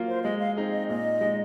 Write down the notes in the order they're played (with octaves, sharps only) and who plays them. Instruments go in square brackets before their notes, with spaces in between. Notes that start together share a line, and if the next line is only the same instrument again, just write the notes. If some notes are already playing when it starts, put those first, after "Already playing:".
Already playing: [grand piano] F#3 A#3 F4
[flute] C5
[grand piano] G#3 [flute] D#5
[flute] F5
[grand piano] C4 D#4 G#4
[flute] D#5
[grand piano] A#2 [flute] D#5
[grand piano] G#3 D#4